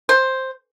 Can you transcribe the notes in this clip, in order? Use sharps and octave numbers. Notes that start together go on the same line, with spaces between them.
C5